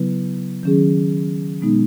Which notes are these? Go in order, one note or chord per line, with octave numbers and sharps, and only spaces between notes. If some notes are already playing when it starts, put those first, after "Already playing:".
Already playing: C#3 F#3 B3 E4 B4
D#3 F#3 C#4 G#4
B2 G#3 B3 D#4